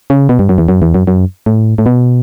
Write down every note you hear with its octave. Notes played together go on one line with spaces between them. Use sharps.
C#3
B2
G2
F#2
E2
F#2
E2
F#2
F#2
A2
A2
B2